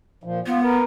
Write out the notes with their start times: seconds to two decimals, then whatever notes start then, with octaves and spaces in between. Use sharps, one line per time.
0.24 A#2 F3
0.46 B3 F4
0.62 A#4 B4